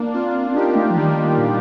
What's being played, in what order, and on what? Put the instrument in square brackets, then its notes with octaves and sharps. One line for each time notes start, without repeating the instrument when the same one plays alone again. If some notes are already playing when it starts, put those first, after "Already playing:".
Already playing: [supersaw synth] A#3 D4
[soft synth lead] C4 [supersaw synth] D4 F4
[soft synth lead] C4
[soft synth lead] D4 [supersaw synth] D#4 G4
[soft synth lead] A3
F3
[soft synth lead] D#3 [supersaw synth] G3 A#3
[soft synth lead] D#3
A#2